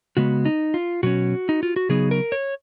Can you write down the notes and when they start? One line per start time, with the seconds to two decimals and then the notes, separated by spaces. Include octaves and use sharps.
0.17 C#3 G#3 B3 F#4
0.45 D#4
0.74 F4
1.03 B2 F#3 C#4 F#4
1.49 D#4
1.63 F4
1.76 F#4
1.89 C#3 F#3 B3 D#4 G#4
2.11 A#4
2.32 C#5